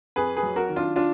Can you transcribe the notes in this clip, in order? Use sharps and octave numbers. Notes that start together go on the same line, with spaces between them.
F2 G#4 B4
G#4 B4
F#3
F#4 A#4
D#3
D4 F4
D4 F4